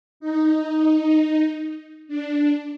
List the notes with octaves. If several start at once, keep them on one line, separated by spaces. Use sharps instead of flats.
D#4
D4